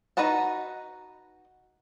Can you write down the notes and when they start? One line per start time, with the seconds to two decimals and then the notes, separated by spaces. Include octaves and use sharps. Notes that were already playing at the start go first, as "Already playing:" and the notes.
0.17 D#4 F#4 B4 F#5 A5